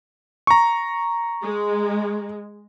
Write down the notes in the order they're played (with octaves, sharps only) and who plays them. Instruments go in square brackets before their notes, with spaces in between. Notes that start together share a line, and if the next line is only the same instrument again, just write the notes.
[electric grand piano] A#5 C#6
[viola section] G#3